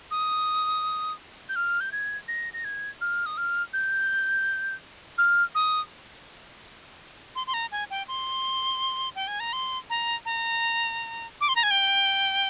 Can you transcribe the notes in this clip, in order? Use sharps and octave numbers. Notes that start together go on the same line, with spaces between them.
D#6
G6
F6
G6
G#6
A#6
A#6
G#6
F6
D#6
F6
G6
F6
D#6
C6
C6
A#5
G#5
G5
C6
G5
G#5
A#5
C6
A#5
A#5
D6
C6
A#5
G#5
G5